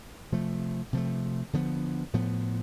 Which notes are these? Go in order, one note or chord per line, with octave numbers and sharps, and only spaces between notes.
C3 F3 A3
C3 F3 A3
D3 F3 B3
A2 F3 B3